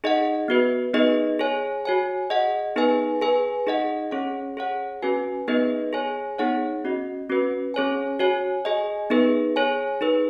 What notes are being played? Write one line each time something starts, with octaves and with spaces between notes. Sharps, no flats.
D#4 G#4 D#5 F#5
B3 F#4 B4
B3 D#4 G#4 B4 D#5
G#4 C#5 G#5
F#4 C#5 G#5
G#4 D#5 F#5
B3 D#4 G#4 B4 G#5
G#4 B4 G#5
D#4 G#4 D#5 F#5
C#4 G#4 C#5 F#5
G#4 C#5 F#5
C#4 F#4 B4 G#5
B3 D#4 G#4 B4 D#5
G#4 C#5 G#5
B3 D#4 G#4 C#5 F#5
C#4 F#4 D#5
C#4 F#4 B4
C#4 G#4 C#5 G#5
F#4 C#5 G#5
G#4 D#5 G#5
B3 D#4 G#4 B4
G#4 C#5 G#5
D#4 G#4 B4